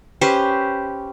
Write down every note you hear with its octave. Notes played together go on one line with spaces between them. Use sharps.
C#4 G4 B4 C5